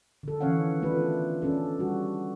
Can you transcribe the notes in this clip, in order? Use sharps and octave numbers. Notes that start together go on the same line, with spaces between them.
D3 A4
D#3 E3 C#4 C#5 F5 F#5
A3 B3 D4 F4 B4
C#4 D4 A4
G3 F#4